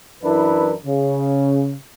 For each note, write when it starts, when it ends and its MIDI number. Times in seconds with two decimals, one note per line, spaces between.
0.22 0.73 42
0.22 0.73 52
0.22 0.73 62
0.22 0.73 64
0.22 0.73 70
0.22 0.73 71
0.85 1.74 49